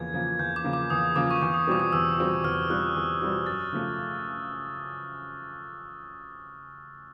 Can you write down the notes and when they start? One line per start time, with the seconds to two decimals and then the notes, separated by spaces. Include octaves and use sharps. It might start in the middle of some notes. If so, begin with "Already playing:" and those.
Already playing: E2 C#3 F3 A#3 G#6
0.14 C#3 F3 A#3
0.39 E2 G6
0.56 D6
0.64 C#3 F3 A#3
0.73 D6
0.90 E2 D#6
1.16 C#3 F3 A#3 D6
1.31 C#6
1.42 E2 D6
1.54 D#6
1.67 B2 G3 C4 F4 D6
1.80 D#6
1.93 E2 E6
2.18 B2 G3 C4 F4
2.44 E2 F6
2.70 B2 G3 C4 F4 F#6
2.96 E2
3.21 B2 G3 C4 F4
3.46 F#2 A6
3.73 C#3 F3 A3